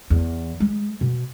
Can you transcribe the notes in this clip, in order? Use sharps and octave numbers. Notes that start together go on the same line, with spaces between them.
E2
G#3
B2